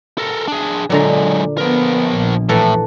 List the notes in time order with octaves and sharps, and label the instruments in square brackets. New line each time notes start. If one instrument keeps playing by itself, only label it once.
[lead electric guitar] A4 A#4
D4 G#4
[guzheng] A#2 D3 A#5 [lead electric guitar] F#3 G#3
[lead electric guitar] F3 A#4 [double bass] B3
[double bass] A#1
[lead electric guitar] A2 [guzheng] E3 A4 A#5